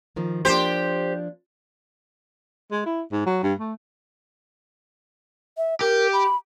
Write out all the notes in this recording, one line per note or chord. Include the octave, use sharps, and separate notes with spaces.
D#3 F3
F3 A#3 D4 G4 C5
G#3
E4
G#2
F#3
G2
A3
E5
G4 A#4
B5